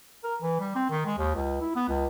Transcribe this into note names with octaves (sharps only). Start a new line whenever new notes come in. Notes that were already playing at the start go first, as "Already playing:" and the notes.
A#4
E3
G3
C4
D#3
G#3
D#2
C#2
E4
B3
C#2